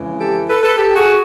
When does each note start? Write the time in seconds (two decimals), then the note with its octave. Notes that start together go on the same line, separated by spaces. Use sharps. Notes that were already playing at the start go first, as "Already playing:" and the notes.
Already playing: F2 C#3 E3 G#3
0.20 G4 A4
0.49 A4 B4
0.62 A4 B4
0.76 G4 A4
0.95 F#4 G#4